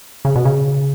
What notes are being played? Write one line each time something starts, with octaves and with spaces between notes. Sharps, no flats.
C#3
B2
C#3